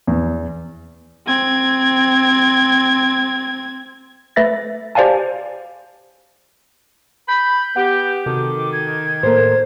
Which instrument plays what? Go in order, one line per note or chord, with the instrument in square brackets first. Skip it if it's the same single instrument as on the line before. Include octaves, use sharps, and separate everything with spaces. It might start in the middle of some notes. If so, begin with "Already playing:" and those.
[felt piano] E2
[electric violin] C4 G#6
[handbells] A3 B4 E5 A6 A#6
G4 C5 D5 F5 G#5 A5
[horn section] B5 [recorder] G6
[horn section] B3 G4 [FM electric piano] F#5
[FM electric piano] C3 F#4 A4 [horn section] D#3 [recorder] D6
[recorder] G#6
[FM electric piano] A2 A4 A#4 [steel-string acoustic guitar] A#3 C5